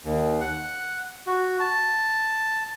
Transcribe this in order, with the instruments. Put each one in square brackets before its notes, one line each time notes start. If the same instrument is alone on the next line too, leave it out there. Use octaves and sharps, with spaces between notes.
[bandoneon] D#2
F#5
F#4
A5